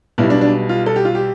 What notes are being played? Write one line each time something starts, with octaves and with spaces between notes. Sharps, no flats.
B1 B2 G3 E4
D4
D4
F4
A4
G4
F4
G4